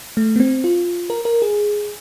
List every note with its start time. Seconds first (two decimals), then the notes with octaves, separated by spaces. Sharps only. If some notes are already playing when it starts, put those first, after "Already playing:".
0.17 A3
0.36 B3
0.40 C4
0.64 F4
1.10 A#4
1.25 A#4
1.42 G#4